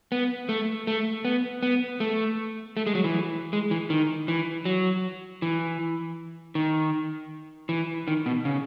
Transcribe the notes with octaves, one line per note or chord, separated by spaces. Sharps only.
B3
A3
A3
B3
B3
A3
A3
G#3
F#3
E3
G#3
E3
D#3
E3
F#3
E3
D#3
E3
D#3
B2
C#3